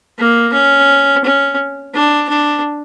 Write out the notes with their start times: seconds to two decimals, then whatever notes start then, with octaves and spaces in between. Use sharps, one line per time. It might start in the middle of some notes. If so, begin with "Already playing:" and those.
0.18 A#3
0.53 C#4
1.24 C#4
1.94 D4
2.29 D4